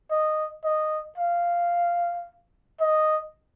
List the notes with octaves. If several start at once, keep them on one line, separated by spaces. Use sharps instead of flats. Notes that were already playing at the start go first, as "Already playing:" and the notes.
D#5
D#5
F5
D#5